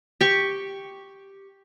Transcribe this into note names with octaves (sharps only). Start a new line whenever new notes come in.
G4 C#6